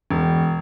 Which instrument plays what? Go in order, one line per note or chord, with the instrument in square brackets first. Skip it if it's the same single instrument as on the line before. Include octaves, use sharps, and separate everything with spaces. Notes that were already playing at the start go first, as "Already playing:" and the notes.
[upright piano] E1